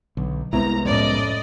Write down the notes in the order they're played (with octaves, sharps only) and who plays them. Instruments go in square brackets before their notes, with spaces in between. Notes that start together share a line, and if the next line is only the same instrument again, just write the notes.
[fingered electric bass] B1 [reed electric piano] D3
[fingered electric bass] C2 G#3 B3 [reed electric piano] C4 E4 [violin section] A#5
[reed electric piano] F2 C#4 [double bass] A2 [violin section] D5 D#5